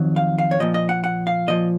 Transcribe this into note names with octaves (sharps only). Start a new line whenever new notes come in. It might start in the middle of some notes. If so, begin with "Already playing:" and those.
Already playing: F2 D#3 F#3
F5
F5
C#5
A#2 F3 D#5
D#5
F#5
F#5
F5
A#2 F3 D#5